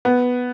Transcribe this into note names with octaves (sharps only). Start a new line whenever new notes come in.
B3